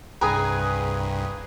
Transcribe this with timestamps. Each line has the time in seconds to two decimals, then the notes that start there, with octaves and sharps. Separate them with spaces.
0.21 C2 G2 G#4 B4 G5 G#5 A#5